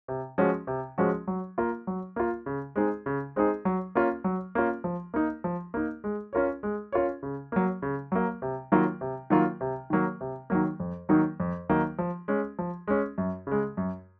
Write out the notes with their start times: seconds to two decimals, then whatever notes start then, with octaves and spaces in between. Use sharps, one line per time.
0.08 C3
0.38 F3 G#3 C#4 F#4
0.67 C3
0.98 F3 G#3 C#4 F#4
1.28 F#3
1.58 A#3 F4
1.87 F#3
2.16 A#3 F4
2.46 C#3
2.76 G#3 C4 D#4 G#4
3.06 C#3
3.36 G#3 C4 D#4 G#4
3.65 F#3
3.95 A#3 C#4 F4
4.24 F#3
4.55 A#3 C#4 F4
4.84 F3
5.14 A#3 D#4
5.44 F3
5.74 A#3 D#4
6.04 G#3
6.33 C#4 F4 A#4 C#5
6.63 G#3
6.92 C#4 F4 A#4 C#5
7.23 C#3
7.52 F#3 A#3
7.82 C#3
8.12 F#3 A#3
8.42 C3
8.72 D#3 F#3 A#3 F4
9.01 C3
9.30 D#3 F#3 A#3 F4
9.61 C3
9.90 D#3 F#3 A#3
10.21 C3
10.50 D#3 F#3 A#3
10.80 F2
11.09 D#3 F#3 A#3 D#4
11.40 F2
11.69 D#3 F#3 A#3 D#4
11.99 F3
12.28 G#3 C#4
12.59 F3
12.88 G#3 C#4
13.18 F#2
13.47 C#3 G#3
13.77 F#2